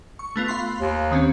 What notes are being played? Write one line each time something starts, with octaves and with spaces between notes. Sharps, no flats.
C#6
A3 B3 F4
F5 B5 C6
D#2
D#3 C4 C#4